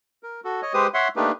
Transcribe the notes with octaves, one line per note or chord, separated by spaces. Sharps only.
A#4
F#4 A4
C#5 D#5
G#3 G4 B4 C5 D#6
C#5 E5 F#5 C6
A3 A#3 D4 D#4 G4 B4